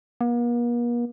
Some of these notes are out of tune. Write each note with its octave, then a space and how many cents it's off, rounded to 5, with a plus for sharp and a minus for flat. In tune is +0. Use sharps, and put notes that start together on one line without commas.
A#3 +45